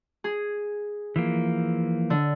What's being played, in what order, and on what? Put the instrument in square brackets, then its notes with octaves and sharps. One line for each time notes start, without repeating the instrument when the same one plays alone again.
[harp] G#4
[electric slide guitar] E3 F3 A#3
[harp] D3